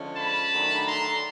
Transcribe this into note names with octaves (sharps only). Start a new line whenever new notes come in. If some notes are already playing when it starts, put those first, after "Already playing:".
Already playing: D3 F3 G#3 C#4
A5 B5
D#3 F#3 A3 D4
A#5 C6